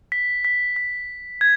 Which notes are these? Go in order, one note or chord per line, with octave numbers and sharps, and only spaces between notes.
B6
B6
B6
G#6